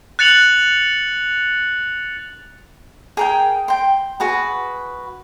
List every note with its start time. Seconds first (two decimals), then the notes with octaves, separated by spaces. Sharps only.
0.19 F#6 A6 C#7 F7 F#7
3.17 G#4 A#4 G5
3.68 G5 C6
4.20 F#4 G#4 B4